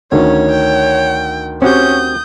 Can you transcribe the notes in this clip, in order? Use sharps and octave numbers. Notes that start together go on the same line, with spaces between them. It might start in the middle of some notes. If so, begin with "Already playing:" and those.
D2 D#3 C#4 C#5
G5
C4 C#4 F#4 G4 D#6 G6